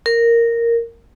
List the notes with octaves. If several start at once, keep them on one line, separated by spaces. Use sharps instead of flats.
A#4